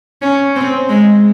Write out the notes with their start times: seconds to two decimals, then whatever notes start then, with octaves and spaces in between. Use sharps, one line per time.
0.22 C#4
0.56 C4
0.89 G#3